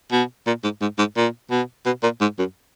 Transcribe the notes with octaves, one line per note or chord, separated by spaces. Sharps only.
B2
A#2
G#2
G#2
G#2
A#2
B2
B2
A#2
G#2
F#2